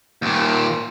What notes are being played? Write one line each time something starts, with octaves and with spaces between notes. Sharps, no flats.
D#2 A#2